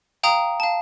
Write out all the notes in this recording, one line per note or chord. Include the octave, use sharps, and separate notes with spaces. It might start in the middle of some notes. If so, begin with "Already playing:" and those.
F5 G5 A#5 D#6
F5 A5